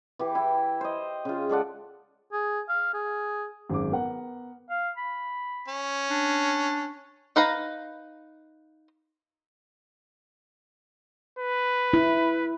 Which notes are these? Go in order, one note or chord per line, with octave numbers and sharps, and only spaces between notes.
E3 G4 B4
E4 G5
C5 D#5
C#3 F4
G#3 A4 D5 F#5
G#4
F5
G#4
G#1 F#2 G#3 D6
B3 A#4 F#5
F5
B5
C#4
D4
D#4 B4 F5 A#5
B4
E4